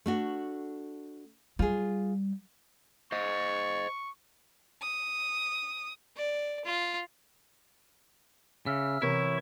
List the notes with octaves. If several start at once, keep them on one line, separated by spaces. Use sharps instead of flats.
A3 D4 F#4
G3 F4 G#4
C5 D#5 C#6
D#6
D5
F4
C#3 E5 E6 F6
C3 E3 E4 A#4 C#5 C#6